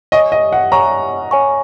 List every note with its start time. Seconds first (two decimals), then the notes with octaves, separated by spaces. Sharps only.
0.12 C#5 D#5 G#5 C#6
0.32 D#5
0.53 F#5
0.72 C#5 G#5 A#5 C#6
1.31 C#5 G#5 C#6